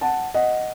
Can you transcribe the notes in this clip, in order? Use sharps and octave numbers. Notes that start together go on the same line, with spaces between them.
F#5 A5
D#5 F#5